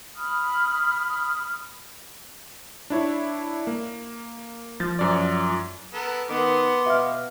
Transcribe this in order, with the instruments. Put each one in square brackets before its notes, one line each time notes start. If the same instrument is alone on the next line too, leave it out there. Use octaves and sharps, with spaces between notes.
[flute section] B5 D#6 F6
[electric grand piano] D4 E4 C#5
A#3
[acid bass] F3 [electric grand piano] A6
[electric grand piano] F#2 D5
[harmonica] B3 A4 A#4
[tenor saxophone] D#3 [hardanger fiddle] B3 [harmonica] C6 D6
[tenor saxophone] B2 [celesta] E5 F5 F6